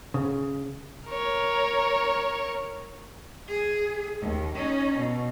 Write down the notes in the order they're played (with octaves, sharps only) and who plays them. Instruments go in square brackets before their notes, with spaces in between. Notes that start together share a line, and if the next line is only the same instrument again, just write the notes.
[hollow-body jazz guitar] C#3
[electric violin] A#4 C#5
[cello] G#4
D#2
C#4 D#4
B2